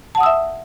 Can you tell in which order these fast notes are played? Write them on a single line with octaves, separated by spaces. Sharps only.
A5 F#5 D#6 E6 E5